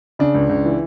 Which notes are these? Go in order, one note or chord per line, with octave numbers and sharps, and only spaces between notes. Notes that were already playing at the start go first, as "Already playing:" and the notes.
C#3 D4
C#2
C#2
E3